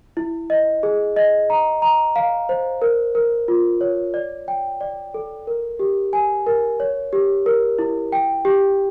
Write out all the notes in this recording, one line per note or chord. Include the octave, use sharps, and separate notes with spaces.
E4
D#5
G#4
D#5
A#5
A#5
F5
C5
A#4
A#4
F4
C#5
D5
G5
D5
A4
A#4
G4
G#5
A#4
C#5
G4
A#4
E4
G5
G4